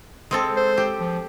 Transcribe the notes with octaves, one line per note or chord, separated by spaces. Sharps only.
G#3 C4 A4
C5
G4
F3